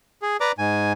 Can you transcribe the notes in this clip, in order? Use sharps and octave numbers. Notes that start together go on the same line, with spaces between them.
G#4
B4 D5 A#5 D6
G#2 G#5